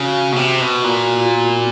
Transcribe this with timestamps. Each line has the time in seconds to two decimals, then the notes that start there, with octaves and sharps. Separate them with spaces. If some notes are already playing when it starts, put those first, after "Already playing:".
Already playing: C#3 F#4
0.32 B2
0.36 C3
0.61 B2
0.77 F#4
0.84 A#2 F4
1.00 F#4
1.16 E4
1.32 B3
1.48 C4